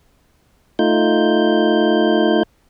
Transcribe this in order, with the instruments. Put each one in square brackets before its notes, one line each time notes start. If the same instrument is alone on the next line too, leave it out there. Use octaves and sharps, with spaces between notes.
[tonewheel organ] A3 D#4 F4 G6